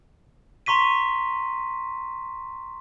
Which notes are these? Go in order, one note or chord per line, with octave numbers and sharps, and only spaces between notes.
A#5 C6 C#6 B6 D#7